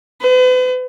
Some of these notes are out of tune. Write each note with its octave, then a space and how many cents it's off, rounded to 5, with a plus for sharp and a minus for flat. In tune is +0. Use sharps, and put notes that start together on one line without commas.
B4 +40